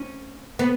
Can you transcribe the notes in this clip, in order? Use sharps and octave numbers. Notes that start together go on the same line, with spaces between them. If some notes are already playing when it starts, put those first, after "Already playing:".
Already playing: C#4
B3